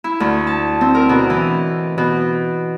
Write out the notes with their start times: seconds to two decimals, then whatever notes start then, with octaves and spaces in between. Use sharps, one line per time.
0.04 E4
0.20 D2
0.47 A5
0.81 C4
0.95 A#4
1.09 B2
1.30 E3
1.98 B2